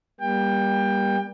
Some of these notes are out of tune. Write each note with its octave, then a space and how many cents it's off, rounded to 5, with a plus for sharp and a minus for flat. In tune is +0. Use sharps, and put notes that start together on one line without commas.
G3 +15 A#3 +40 G5 +20